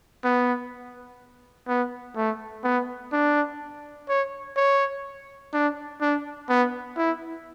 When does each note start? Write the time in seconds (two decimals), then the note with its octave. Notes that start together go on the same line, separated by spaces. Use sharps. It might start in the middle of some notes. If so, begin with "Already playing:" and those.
0.24 B3
1.68 B3
2.16 A3
2.64 B3
3.12 D4
4.09 C#5
4.56 C#5
5.53 D4
6.01 D4
6.49 B3
6.97 E4